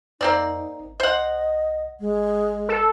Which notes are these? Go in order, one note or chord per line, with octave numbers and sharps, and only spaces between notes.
F2 A#3 C4 D#4 D5
G#1
C2 C5 D#5 F#5
G#1 G#3
A4